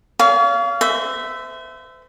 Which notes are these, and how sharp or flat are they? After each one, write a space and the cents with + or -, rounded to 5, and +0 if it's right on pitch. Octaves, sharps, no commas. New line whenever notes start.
C#5 +45 F5 -15
C5 -40 E5 +0